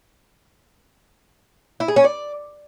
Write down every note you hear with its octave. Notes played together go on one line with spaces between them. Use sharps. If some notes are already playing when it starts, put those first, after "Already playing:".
E4
G#4
C#4
D5